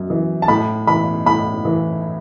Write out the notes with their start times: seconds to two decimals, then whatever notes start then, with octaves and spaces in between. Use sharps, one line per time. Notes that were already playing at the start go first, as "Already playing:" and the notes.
Already playing: F#2
0.10 E3
0.42 A5
0.48 A2 B5
0.87 E3 B5
1.26 A2 B5
1.65 E3